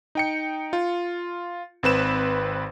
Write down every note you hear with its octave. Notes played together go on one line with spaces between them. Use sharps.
D#4 G5 C#7
F4
G#1 C4 B4 E7